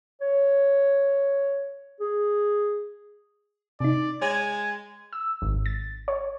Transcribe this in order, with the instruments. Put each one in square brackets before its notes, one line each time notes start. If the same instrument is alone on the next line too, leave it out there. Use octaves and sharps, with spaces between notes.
[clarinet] C#5
G#4
[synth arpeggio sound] C3 D#4 [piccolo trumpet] D5
[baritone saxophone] G#3 [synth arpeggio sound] C#5 [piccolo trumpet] G#6
[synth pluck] E6
G#1
A6
C#5